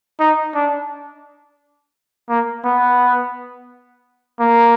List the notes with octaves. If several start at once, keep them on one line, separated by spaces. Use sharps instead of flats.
D#4
D4
A#3
B3
A#3